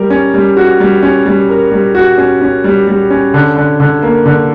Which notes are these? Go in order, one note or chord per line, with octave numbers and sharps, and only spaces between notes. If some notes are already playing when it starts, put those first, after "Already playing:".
Already playing: G3 A#4
C#4
G3
F#4
G3
C#4
G3
A#4
G3
F#4
C#4
C#4
G3
G3
C#4
D3
D3
D3
A#3
D3